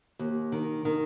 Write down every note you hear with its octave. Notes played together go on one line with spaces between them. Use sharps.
D#2
D#3
D#3